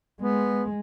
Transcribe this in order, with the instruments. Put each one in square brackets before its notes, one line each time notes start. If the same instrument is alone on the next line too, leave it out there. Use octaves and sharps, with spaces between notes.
[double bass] G#3 [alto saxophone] B3